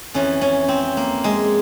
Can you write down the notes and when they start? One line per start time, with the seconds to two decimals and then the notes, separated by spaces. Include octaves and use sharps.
0.14 F2 E3 C#4
0.41 C#4
0.68 C4
0.97 A#3
1.24 G#3